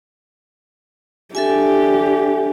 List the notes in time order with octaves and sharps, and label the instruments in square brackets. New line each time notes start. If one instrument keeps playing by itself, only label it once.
[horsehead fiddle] D4 G4 [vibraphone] A4 E5 G#5